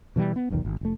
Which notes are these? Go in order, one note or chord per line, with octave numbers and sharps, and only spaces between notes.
B2 E3 F3 G3
B3
F1 B1 E2 D#3
G#1
F1 A3